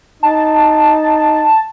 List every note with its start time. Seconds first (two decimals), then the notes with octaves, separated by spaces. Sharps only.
0.23 D#4 A5